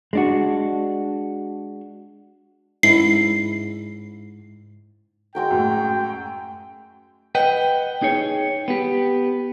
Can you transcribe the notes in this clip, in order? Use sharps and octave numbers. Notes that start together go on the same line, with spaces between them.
G#3 D4 F#4
G#2 C#4 E4 C7
G#3 F#4 A#4 G5
F#2 A2
B4 D#5 F#5 G5
D#4 G#4 C#5
B3 G4